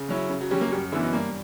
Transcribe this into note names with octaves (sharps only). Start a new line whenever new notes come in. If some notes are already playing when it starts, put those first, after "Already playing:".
Already playing: C#3
F#3 C#4 E4
C#3
F#3
F#3 G3 C#4
A#3
F#2 G3
D3 E3 B3 E4
B2
G2 A#3